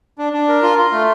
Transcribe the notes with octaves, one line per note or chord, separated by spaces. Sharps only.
D4
D4
A#4
F4
F4
A3